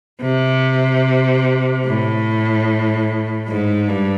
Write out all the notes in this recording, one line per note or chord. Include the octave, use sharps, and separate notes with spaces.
C3
A2
G#2
G2